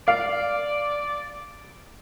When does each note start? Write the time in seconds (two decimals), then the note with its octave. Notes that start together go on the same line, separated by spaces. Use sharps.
0.08 D5 F5